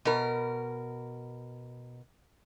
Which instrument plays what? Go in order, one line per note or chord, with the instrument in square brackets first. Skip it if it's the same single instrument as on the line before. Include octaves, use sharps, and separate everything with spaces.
[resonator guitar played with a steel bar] B2 A#4